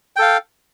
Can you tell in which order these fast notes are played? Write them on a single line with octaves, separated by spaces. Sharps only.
G5 A4 F5